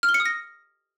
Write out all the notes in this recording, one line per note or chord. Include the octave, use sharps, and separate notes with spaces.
F6
G7
C#7
D#6
A#6